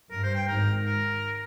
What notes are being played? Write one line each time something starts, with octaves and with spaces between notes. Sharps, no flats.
G2 A#4
C5
G5
G#1 G#2 A#4
A#4